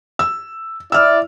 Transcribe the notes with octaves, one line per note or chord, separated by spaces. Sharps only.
E6
E4 D5 E6 F6